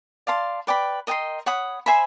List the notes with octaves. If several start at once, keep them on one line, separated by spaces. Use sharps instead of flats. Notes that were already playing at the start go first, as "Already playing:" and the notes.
D5 F5 A5 C6
B4 D5 G5 B5
A#4 D#5 G5 C6
C#5 F#5 B5 D#6
C5 E5 G#5 B5